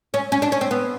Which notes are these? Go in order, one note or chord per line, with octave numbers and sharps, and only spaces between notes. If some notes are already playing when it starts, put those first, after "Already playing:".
C#4
C#4
D4
C#4
C4
B3